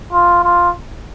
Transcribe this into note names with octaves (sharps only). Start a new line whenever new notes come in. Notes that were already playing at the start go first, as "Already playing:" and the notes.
F4
F4